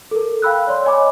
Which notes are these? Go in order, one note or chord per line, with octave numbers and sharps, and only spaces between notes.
A4 A#4
F5 G5 B5 E6 F#6
C#5 D5 C6
C#5 D#5 G#5 B5 D6